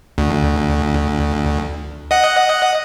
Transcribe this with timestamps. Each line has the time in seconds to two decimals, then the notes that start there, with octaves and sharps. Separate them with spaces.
0.18 D2
2.11 D#5 F#5